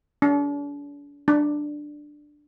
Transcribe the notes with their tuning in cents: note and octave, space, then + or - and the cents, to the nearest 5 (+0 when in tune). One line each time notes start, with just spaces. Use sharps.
D4 -40
D4 +10